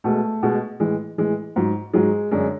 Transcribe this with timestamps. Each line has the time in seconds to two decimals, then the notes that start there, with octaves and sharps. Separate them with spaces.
0.04 B2 G#3 A3
0.43 B2 G#3
0.80 A2 E3 G#3
1.18 A2 E3 G#3
1.56 G#2 F#3
1.93 G#2 F#3 G#3
2.31 F#2 D3 G#3